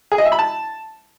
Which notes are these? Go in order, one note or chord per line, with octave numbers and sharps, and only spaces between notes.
G#4
D#5
E5
B5
A5